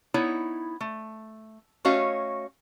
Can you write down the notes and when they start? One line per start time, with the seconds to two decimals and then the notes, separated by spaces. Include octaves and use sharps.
0.14 B3 D#4 E4 C#5
0.81 A3
1.85 A3 C#4 F#4 C#5 D#5 F5